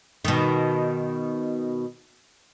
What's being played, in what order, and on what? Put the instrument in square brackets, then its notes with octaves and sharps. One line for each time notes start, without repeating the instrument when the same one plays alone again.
[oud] B2 D#3